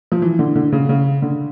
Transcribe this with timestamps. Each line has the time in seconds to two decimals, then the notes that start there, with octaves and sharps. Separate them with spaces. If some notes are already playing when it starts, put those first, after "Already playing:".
0.12 F3
0.22 E3
0.39 D3
0.56 D3
0.72 C#3
0.89 C#3
1.22 D3